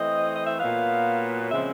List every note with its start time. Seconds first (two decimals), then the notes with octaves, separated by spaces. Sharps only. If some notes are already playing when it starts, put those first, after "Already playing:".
Already playing: E3 A3 C4 D#5
0.35 D#5
0.47 E5
0.59 A#2 F#3 B3 F5
1.50 C#3 F3 G#3 C4 E5